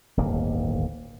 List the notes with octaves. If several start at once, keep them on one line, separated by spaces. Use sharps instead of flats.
D1 G1 D#2 A#3